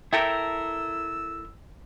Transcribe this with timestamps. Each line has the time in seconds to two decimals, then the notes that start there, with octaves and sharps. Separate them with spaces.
0.13 E4 A4 A#4 E5 G5 E6